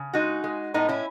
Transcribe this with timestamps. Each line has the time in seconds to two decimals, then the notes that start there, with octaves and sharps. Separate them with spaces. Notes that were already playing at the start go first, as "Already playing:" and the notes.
Already playing: C#3
0.13 G#3 D#4 F#4
0.44 G#3
0.74 A2 B3 D#4
0.89 C#4 E4